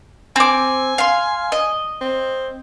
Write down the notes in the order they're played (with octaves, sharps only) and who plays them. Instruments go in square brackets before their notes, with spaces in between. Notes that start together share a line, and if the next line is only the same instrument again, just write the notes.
[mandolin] C4 D6 [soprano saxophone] G#5
[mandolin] F5 C6
D#5
[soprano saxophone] C4